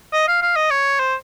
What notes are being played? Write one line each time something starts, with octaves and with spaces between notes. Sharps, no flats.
D#5
F5
F5
D#5
C#5
C5